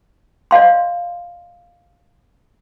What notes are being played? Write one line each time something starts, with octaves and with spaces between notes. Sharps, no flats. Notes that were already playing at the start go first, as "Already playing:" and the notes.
D5 D#5 F5 C6